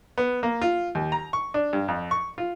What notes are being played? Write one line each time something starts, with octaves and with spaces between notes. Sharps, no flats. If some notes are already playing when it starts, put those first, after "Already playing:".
B3
A#3
F4
D#2
A#5
C#6
D4
G2
F2
C#6
F4